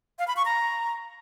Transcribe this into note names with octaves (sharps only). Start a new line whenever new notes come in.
F5
B5
C#6
A#5